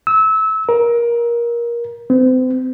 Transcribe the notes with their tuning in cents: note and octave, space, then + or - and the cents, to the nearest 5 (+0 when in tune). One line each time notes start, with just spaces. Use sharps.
E6 -25
A#4 +20
C4 -40